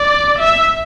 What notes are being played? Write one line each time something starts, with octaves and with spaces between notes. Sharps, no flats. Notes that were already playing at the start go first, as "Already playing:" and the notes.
Already playing: D5
E5